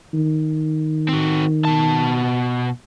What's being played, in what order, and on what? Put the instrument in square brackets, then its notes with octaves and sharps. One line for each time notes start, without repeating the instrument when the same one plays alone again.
[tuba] D#3
[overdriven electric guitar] C4 F#4
B2 A5